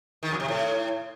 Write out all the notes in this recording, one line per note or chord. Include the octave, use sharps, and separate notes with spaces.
D#3
F2
C3
A2